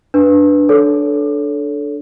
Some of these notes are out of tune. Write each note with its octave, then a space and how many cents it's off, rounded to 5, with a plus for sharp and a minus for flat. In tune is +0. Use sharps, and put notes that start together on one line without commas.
D4 +0 B4 +0
D4 +0 A4 -10 C#5 +25